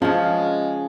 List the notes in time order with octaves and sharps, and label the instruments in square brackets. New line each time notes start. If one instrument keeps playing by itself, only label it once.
[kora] C#3 F3 [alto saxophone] G#3 [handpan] C#4